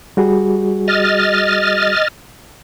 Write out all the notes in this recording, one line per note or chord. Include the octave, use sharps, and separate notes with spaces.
G3 F#4 G#4
D#5 F6 A6